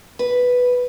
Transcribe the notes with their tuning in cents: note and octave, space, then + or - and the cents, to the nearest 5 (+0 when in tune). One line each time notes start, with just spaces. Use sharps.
B4 +0